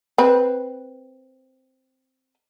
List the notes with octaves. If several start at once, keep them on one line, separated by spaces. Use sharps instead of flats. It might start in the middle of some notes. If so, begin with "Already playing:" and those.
C4 B4